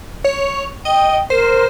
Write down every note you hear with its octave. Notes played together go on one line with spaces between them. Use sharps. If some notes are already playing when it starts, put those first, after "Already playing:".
C#5
D#5 G5
A#4 C5